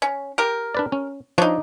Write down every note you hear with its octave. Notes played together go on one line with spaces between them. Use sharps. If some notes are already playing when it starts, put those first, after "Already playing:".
C#4
G4 A#4
D4 B4 D5
C#4
F3 D4 D#4 C#5